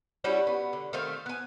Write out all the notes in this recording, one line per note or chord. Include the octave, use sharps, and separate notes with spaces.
G3 C#4 E4 F#4
B3
D3
D#3 A3 C4 F5
B3 G#5